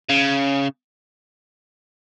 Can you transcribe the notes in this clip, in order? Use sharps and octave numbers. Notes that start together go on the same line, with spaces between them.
C#3